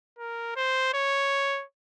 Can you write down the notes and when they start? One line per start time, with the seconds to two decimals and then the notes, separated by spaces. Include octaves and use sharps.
0.18 A#4
0.56 C5
0.94 C#5